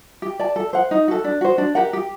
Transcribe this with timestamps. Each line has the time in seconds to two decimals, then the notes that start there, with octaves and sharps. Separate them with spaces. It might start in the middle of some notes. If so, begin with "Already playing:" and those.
0.22 G4
0.39 D5 A5
0.56 A4
0.73 C5 F#5
0.91 D#4
1.08 F#4 A4
1.24 D4
1.41 F#4 C5
1.58 D4
1.75 G4 A#4 F#5
1.93 G4